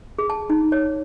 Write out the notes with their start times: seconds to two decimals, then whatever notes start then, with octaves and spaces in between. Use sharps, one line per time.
0.19 G#4
0.30 A5
0.50 D#4
0.72 C#5